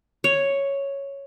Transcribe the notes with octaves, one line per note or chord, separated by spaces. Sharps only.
C#5